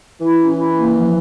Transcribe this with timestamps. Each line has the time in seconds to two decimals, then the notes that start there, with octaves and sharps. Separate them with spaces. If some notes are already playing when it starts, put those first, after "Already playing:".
0.20 E3 E4
0.39 C#4
0.57 E4
0.74 A#3
0.93 F3